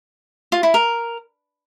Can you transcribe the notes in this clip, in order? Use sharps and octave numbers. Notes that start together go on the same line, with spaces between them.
F4
E4
A#4